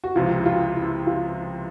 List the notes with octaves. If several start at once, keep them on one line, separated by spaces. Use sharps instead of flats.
F#4
C#2 C3 F3 F4
E4
F4
E4
F4